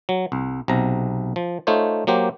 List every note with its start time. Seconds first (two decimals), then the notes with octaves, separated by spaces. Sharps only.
0.09 F#3
0.32 C2
0.68 B1 C3 A#5
1.36 F3
1.67 A3 D#4 F4 C5 C#5
2.07 F#3 A#3 G4 C5